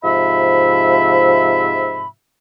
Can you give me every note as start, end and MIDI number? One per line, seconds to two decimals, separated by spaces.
0.03 2.08 44
0.03 2.08 48
0.03 2.08 53
0.03 2.08 76
0.03 2.08 83